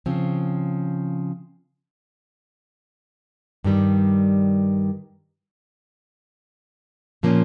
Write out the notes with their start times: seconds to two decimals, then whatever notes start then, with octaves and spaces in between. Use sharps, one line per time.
0.06 C#3 F3 C4
3.64 G2 D#3 G3
7.23 A#2 F3 A#3 C#4